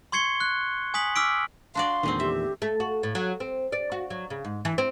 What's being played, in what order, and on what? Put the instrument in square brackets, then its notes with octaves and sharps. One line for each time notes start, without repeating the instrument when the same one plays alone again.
[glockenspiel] C6 C#6 G#6 C7 C#7 G7
F#6
G#5 D#6 B6 F#7
D6 E6 F6 B6 D7
[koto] D4 F#4 D5 [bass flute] F5 [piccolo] C6
[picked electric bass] E2 A#2 D#3 [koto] D3 G#3 C4
[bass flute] G4 [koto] E5
[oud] A3
F#4
A2
F#3
C4
D5
F#4
F#3
C#3
G#2
E3
C4